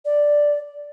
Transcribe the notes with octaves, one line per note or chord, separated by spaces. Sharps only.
D5